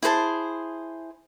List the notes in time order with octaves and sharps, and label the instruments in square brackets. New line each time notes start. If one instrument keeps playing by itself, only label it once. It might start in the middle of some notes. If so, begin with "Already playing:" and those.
[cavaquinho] E4 G#4 C5 A5